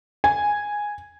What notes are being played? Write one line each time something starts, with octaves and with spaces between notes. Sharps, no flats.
G#5